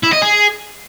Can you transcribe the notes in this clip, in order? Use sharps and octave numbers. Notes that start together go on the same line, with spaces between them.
E4
D#5
G#4